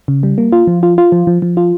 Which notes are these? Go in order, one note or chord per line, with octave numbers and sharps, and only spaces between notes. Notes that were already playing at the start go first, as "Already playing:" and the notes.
C#3
G3
A#3
F4
F3
F4
F4
F3
F3
F3
F4